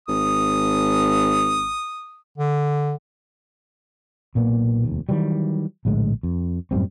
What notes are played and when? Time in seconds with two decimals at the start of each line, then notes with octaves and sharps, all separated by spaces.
0.08 G#1 D#6
2.38 D3
4.35 B1 A#2 A#3 B3
4.84 F1 D#2
5.09 D#3 E3 F#3 G3
5.85 A#1 A2 D3 G#3
6.23 F2
6.71 F#2 A2 G3 C4